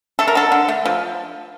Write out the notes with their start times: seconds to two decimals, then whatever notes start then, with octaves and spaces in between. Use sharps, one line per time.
0.19 A3 A4
0.28 A#4
0.35 D3 A4
0.52 D3
0.68 A3
0.85 F3